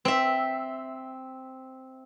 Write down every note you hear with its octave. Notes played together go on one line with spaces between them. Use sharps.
C4 E5